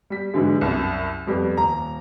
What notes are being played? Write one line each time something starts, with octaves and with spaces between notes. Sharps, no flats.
G3 B6
G#2 D3 E3 F#3 G#3
C2 F#2
F2 G3 B3
D#1 A#5